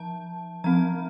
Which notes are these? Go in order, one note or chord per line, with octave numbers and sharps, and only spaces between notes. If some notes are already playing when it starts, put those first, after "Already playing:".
Already playing: F3 A5
F3 C4 A#5